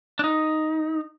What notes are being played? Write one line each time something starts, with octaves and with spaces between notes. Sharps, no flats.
D4
D#4